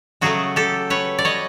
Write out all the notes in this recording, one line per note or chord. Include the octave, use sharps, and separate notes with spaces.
C#3 F#3 A3 F#4 G#4
G4 A4
B4 C#5
D5
C#5 D#5